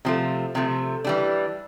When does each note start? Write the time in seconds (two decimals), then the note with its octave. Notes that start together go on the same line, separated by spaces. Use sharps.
0.05 C3 F3 A3
0.55 C3 F3 A3
1.04 E3 G3 D4